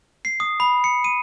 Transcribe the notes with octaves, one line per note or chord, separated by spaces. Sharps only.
C7
D#6
B5
C#7
D#7